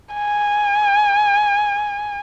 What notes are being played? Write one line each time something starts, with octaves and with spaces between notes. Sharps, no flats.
G#5